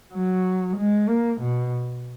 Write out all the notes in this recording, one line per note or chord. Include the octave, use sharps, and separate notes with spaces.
F#3
G#3
A#3
B2